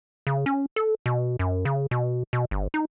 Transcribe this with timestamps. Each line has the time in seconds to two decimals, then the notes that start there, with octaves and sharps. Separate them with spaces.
0.27 C#3
0.46 C#4
0.76 A4
1.06 B2
1.39 F#2
1.65 C#3
1.91 B2
2.33 B2
2.51 G1
2.74 D#4